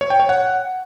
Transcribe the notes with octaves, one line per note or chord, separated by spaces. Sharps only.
C#5
G5
C#5
F#5